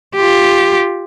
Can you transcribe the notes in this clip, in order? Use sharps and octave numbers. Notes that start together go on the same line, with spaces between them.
F4 G4